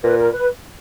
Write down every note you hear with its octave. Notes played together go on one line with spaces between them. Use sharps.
A#2 B4
A#4
B4